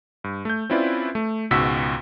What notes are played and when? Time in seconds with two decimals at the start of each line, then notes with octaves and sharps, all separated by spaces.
0.24 G2
0.45 A3 G6
0.70 C4 C#4 E4 F4 B4 D5
1.15 A3
1.51 C#2 G#2 B2 F#4 E6 B6